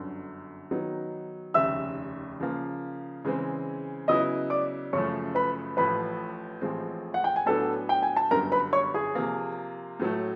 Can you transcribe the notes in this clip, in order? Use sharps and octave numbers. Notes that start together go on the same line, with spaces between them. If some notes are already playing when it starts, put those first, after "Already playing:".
Already playing: G1 F#2 D3
D#3 F#3 B3 D#4
F1 D#2 C#3 E5 E6
C#3 F3 A#3
C#3 E3 G#3 C4
C#3 F#3 B3 E4 D#5 D#6
D5 D6
F#2 C#3 F3 A3 C#5 C#6
B4 B5
A1 A2 F3 B4 B5
A1 A2 F3 G#3 C4
F#5
G5
G#5
A2 F#3 B3 D4 A4 A5
G5
G#5
A5
G1 F#2 D3 G3 B3 A#4 A#5
B4 B5
C#5 C#6
G#4 G#5
C3 F3 A#3
A2 F#3 A3